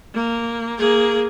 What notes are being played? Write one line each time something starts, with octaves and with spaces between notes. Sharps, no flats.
A#3
A#3 G#4